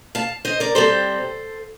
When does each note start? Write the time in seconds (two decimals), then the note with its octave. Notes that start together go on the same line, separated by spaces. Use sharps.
0.15 F5 A5
0.45 C5 D#5
0.60 A#4 D5
0.75 C3 G3 C4 A4 C5